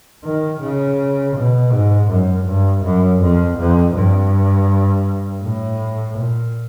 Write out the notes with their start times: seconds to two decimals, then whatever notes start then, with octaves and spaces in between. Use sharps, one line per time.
0.24 D#3
0.61 C#3
1.36 B2
1.72 G#2
2.09 F#2
2.46 G2
2.84 F#2
3.21 F2
3.58 F2
3.95 G2
5.43 A2
6.17 A#2